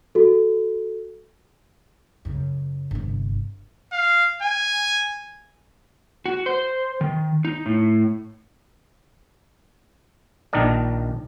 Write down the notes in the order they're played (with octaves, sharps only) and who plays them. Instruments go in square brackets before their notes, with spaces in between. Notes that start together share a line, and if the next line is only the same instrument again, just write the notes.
[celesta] F#4 A4
[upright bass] F#2 C#3
G1 C3
[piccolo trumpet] F5
G#5
[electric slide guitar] F#4
C5
D#3
D#4
A2
[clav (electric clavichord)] A#1 D#3 D4 D#4 A#4 D5